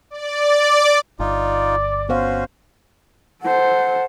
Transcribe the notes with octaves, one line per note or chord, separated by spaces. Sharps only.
D5
G1 D#4 F4 D5
B3 C#4 F#4 C5 F5
A4 C5 F#5